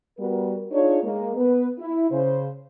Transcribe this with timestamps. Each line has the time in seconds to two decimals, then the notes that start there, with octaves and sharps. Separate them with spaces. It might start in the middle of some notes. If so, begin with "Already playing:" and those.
0.19 G3 B3 F#4 A#4
0.72 D4 D#4 F4 G#4 C#5
1.04 G#3 A#3
1.36 B3 B4
1.79 E4
2.11 C#3 C5